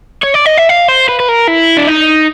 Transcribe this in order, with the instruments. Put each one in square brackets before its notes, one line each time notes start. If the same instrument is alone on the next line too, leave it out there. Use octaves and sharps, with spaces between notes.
[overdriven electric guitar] C#5
D5
D#5
E5
F5
C5
B4
B4
A#4
E4
D4
D#4